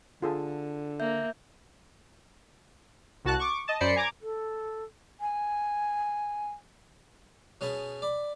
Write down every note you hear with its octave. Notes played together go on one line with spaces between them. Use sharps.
D3 F4 G#4 A4
A#3 E5 G6
C2 F#4 A5 F#6
C#6 D6
D#5 A5
F#2 C5 D5 B5 C7 C#7
G#5 A#5 D6 G#6
A4
G#5
B2 C#4 G#4 A5 B5
D5 B5